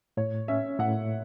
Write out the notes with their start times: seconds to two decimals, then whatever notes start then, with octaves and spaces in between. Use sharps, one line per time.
0.17 A2 C#5
0.48 C#4 E5
0.79 A2 F#5